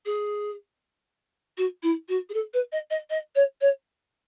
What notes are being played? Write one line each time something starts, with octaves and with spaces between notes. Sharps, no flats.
G#4
F#4
E4
F#4
G#4
A4
B4
D#5
D#5
D#5
C#5
C#5